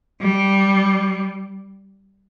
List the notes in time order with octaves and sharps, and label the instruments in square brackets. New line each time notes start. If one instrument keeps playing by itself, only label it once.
[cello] G3